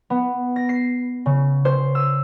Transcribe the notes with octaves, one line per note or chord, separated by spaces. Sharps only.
B3
A#6
C7
C#3
C5
E6